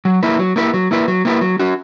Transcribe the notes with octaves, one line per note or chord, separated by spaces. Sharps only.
F#3
A#3 E4 B4
F#3
A#3 E4 B4
F#3
A#3 E4 B4
F#3
A#3 E4 B4
F#3
C#4 F#4